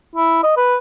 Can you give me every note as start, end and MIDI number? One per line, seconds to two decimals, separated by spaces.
0.16 0.38 64
0.43 0.56 75
0.57 0.78 71